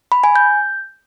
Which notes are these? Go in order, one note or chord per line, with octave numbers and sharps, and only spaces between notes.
B5
G#5
G6